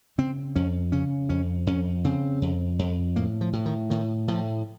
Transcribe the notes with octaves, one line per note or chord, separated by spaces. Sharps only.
C#3 C4
F2 C#4
C#3 C#4
F2 C#4
F2 C#4
C#3 C4
F2
F2
A2 A#3
F3
A2
D#3
A2 D#3
A2 F3